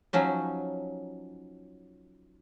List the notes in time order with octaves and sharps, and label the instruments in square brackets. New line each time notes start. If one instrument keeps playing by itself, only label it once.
[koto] F3 F#3 C#4 D#4